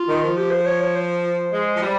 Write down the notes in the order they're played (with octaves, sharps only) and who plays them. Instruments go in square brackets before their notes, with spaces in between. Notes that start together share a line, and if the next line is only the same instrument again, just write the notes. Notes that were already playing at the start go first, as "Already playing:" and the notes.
Already playing: [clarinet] F4
[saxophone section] D#3
F3
[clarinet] G4
C5
C#5
C#5
C5
[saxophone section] G#3
F3
G3